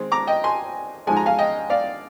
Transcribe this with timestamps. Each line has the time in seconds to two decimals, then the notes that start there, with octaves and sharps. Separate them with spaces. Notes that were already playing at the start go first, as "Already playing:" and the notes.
Already playing: D#3 G#3 C4
0.12 A#5 D6
0.27 D#5 G5
0.44 G#5 C6
1.07 G#2 F3 G#3 G#5
1.17 A#5
1.26 F5 G#5
1.38 D#5 G5
1.70 D5 F5